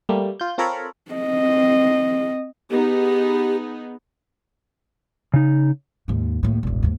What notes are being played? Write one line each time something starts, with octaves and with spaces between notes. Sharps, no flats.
G3 A3 A#3
F4 G6
C4 F4 A4 A#4 C#5 B5
C4 D#5
B3 D#4 G4 G#4
C#3 D#4
D#2 G#2
D#2 A2
E1 A1
D#2 G#2